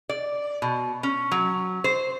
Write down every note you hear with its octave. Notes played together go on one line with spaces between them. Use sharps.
D5
B2
C#4
F#3
C5